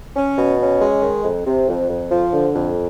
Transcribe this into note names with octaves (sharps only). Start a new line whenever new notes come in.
C#4
B2
C#4
G#3
D#3
F2
C3
F2
F2
F3
D3
F2